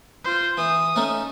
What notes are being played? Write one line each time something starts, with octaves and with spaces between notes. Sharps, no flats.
F4 C5
E3 D#6
A3 C#4 D#4